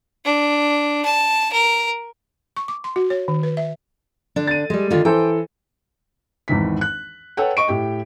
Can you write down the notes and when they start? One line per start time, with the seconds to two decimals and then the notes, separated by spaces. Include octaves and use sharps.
0.25 D4
1.05 A5
1.53 A#4
2.57 C#6
2.68 D6
2.84 C6
2.96 F#4
3.10 C#5
3.28 D#3
3.43 B4
3.57 E5
4.36 D3 D4
4.47 A6 D#7
4.70 G3 G#3
4.90 D3 D#3 F4
5.05 E3 A4 C5 G5
6.48 G#1 E2 D#3 B6
6.81 F#6
7.37 A4 B4 C#5 F#5 G5
7.57 D#5 C#6 D7
7.68 A2 G4 G5